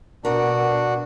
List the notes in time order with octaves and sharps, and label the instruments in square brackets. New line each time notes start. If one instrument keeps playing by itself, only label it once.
[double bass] B2 [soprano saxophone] D4 [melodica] F#4 [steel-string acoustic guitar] A#4 F#5